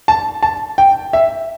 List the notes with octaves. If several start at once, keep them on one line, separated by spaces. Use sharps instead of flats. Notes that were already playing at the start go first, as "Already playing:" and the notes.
A5
A5
G5
E5